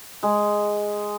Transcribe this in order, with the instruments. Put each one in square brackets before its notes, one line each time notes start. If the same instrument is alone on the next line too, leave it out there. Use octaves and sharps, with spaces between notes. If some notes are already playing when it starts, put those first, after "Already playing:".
[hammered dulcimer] G#3